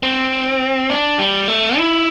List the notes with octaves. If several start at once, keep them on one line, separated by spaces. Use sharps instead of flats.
C4
D4
G3
A3
E4